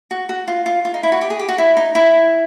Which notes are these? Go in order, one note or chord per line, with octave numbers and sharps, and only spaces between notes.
F#4
F#4
F4
F4
F4
D#4
E4
F#4
G4
G#4
G4
F#4
E4
D#4
E4